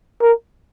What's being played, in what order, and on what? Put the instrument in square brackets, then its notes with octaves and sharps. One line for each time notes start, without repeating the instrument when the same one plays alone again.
[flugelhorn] A#4